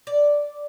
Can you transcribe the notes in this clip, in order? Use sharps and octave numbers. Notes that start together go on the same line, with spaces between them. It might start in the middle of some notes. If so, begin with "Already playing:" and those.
D5